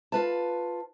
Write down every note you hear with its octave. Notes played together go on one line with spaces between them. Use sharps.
F4 B4 A5